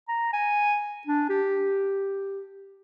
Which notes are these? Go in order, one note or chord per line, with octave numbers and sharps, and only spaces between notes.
A#5
G#5
D4
G4